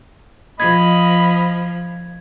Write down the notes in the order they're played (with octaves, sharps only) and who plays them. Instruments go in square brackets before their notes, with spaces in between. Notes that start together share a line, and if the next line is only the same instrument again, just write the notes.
[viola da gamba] F3 [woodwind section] D#5 [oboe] B5 [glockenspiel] G#6